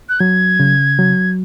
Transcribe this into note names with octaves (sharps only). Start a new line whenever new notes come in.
F#6
F#3 G#6
C#3
F#3